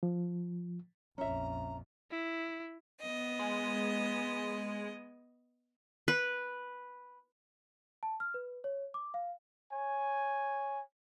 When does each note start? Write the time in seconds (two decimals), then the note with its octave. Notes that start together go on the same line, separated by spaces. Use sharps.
0.03 F3
1.18 A#1 F2 C#4 E5 A#5
2.11 E4
3.01 B3 D#5
3.39 G#3
6.08 B4
8.03 A5
8.20 F6
8.34 B4
8.64 C#5
8.94 D6
9.14 F5
9.73 C#5 G#5